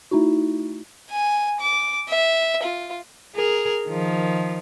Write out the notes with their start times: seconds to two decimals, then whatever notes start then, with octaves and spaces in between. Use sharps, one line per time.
0.11 A3 D#4 E4 F#4
1.10 G#5
1.60 D6
2.09 E5
2.62 F4
3.36 G#4 A#4
3.88 D#3 F3